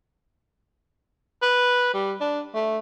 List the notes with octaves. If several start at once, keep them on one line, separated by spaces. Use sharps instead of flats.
B4
G3
D4
A3